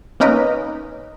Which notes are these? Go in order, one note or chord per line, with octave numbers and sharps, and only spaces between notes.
A#3 C#4 D#4 A#4 B4 D#5